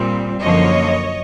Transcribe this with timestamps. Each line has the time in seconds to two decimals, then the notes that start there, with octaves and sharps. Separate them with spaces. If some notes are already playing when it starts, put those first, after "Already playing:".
Already playing: A#2 G3 C4
0.42 F#2 D3 F3 A#3 C#5 D#5